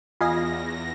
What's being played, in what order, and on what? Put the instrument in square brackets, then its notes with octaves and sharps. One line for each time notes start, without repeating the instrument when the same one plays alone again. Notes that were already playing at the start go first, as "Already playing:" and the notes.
[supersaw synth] E2 A#6 [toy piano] F4 [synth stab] D#5 F5 G#5